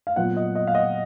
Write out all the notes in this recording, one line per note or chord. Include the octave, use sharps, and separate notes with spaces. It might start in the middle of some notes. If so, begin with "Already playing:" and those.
F5
A#2 F#3 B3 F4 F#5
D#5
D#5
F5
D#5